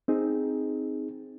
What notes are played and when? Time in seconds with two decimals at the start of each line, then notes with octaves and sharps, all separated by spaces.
0.08 C4 D#4 G#4